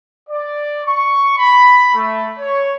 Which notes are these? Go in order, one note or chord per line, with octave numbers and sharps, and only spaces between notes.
D5
C#6
B5
A3
C#5